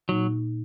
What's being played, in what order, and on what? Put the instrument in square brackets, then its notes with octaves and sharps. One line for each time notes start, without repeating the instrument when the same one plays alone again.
[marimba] A#2 A#3 D#4 [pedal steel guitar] F#3